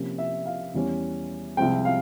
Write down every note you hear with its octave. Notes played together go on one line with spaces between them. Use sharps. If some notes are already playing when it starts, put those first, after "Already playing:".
Already playing: C3 F3 A#3 C#4
E5
F5
E2 E3 G3 C#4
C2 C3 F3 G#3 C4 G5
F5